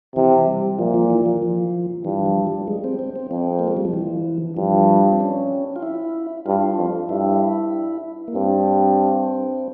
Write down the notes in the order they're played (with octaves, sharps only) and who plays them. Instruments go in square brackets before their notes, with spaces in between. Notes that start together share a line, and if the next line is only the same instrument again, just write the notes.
[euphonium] C3 [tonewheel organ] E3
[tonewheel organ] G3
[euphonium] A#2 [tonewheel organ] F3
[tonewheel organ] F3
E3
F3
F3
[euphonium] G2 [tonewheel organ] E3
[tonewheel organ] F3
G3
G#3
C4
C4
C4
[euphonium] F2 [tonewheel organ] C4
[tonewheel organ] A#3
G#3
G3
F3
E3
[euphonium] G2 [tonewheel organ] F3
[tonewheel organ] C4
C#4
F4
E4
[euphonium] G2 [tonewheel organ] F4
[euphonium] F2
[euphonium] G2 [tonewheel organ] E4
[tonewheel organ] A#3
[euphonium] G2 [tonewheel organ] C4